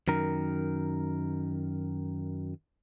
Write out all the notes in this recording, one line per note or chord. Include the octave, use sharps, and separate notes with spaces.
F#2 D#3 A#4